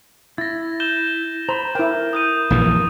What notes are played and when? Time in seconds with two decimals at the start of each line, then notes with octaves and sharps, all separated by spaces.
0.38 E4 A6 A#6
0.80 G6 E7 G7
1.49 C5 A#5 B5
1.75 E4 A#4 G5
2.13 D#6 G6 D#7
2.50 A#1 G2 E3